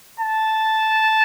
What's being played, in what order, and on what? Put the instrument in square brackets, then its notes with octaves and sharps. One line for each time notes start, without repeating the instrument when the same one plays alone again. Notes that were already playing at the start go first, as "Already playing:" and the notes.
[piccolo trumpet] A5